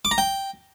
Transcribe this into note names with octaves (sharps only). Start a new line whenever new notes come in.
D6
A#5
G5